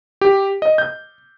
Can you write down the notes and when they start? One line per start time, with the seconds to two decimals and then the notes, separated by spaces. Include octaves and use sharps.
0.21 G4
0.62 D#5
0.78 G6